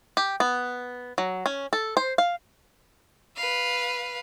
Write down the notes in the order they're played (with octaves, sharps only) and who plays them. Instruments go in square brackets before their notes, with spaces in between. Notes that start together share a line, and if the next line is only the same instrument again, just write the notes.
[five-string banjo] G4
B3
F#3
C#4
A4
C5
F5
[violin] B4 F5